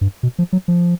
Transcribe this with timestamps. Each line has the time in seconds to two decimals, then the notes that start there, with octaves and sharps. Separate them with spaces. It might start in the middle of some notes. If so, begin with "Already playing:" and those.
0.01 G2
0.23 B2
0.39 F3
0.53 F#3
0.68 F3